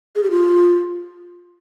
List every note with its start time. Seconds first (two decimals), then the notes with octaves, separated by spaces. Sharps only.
0.15 G#4
0.23 G4
0.30 F4